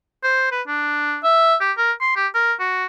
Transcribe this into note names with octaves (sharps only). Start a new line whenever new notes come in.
C5
B4
D4
E5
G4
A#4
C6
G4
A#4
F#4